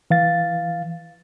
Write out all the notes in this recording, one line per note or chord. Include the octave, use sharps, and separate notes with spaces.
E3 F5 A6